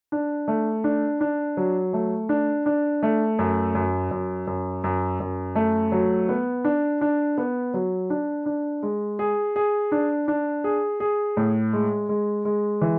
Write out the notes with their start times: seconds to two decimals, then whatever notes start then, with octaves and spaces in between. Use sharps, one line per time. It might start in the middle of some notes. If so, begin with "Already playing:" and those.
0.12 D4
0.48 A3
0.84 D4
1.21 D4
1.57 F#3
1.93 A3
2.29 D4
2.66 D4
3.03 A3
3.39 F#2
3.75 F#2
4.11 F#2
4.47 F#2
4.84 F#2
5.20 F#2
5.55 A3
5.92 F#3
6.29 B3
6.65 D4
7.01 D4
7.38 B3
7.74 F#3
8.10 D4
8.46 D4
8.83 G#3
9.19 G#4
9.56 G#4
9.92 D4
10.28 D4
10.64 G#4
11.00 G#4
11.37 A2
11.73 G#3
12.09 G#3
12.45 G#3
12.81 E3